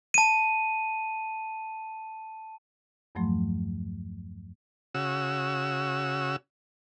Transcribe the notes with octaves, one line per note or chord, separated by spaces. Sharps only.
A5 D#7
E2 G2 F3 F#3 A3 C6
C#3 F#4 E6